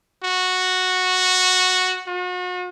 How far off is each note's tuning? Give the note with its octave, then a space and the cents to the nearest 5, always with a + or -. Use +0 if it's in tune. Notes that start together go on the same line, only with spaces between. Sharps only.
F#4 -5
F#4 -40